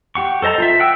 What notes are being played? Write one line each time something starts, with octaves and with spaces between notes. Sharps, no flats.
G4 F#5 C#6
A4 C5 D#5 A5 A#5
F4 C5 E5
F#5 G5 E6